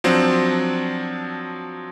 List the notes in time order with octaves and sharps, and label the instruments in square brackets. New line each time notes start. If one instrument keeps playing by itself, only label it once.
[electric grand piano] F3 F#3 C4 D4